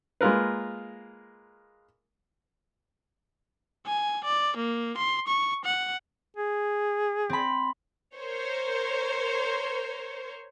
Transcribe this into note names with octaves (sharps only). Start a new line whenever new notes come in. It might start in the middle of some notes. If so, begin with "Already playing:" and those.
G#3 A#3 F4 A#4 B4
G#5
D5
A#3
C6
C#6
F#5
G#4
C4 B5
A#4 C5 C#5